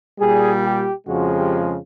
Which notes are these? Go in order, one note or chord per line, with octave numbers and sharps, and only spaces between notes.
A#2 G3 G#4
G4
F2 C#3 F3 G#3 F#4
G4